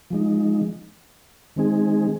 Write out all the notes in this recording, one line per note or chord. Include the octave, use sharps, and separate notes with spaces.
F3 G#3 D#4
D#3 G#3 C4 D#4 G#4